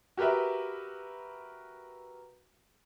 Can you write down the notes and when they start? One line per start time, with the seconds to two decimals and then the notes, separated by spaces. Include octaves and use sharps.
0.17 F#4 G4 A#4 B4 E5